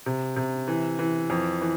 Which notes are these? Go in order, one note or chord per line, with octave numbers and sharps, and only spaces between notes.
C3
C3
E3
E3
F2
E3